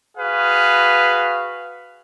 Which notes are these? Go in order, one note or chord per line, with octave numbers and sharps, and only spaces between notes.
F#4 G#4 B4 F5